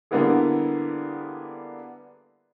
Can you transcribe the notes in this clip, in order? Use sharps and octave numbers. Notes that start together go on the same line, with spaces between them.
D3 G3 A#3 B3 E4 G#4